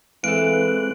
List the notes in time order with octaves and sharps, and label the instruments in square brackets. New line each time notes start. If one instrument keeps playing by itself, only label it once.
[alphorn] E3 [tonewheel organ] G#3 C4 F#6 [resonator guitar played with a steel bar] A4 F5 [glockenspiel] D7